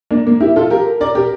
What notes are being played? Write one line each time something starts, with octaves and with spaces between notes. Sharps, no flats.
A#3 D4
A#3
E4 G4
F4 A4
G4 A#4
A#4 D5
G4 A#4